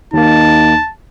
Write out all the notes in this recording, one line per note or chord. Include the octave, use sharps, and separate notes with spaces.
D#2 A#3 D#4 A5